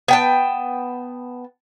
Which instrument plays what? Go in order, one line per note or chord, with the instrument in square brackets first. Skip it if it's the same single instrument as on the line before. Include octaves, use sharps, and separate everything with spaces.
[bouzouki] B3 G5 A5